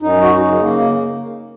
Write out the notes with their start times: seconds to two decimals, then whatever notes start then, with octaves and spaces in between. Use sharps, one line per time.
0.01 F#2 D#4
0.22 F#4
0.31 D#4
0.45 C#3
0.60 A#3